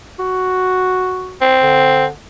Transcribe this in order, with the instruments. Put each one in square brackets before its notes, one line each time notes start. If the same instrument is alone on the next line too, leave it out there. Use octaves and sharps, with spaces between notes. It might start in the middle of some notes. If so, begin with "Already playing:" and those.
[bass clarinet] F#4
[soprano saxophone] C4
[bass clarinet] D3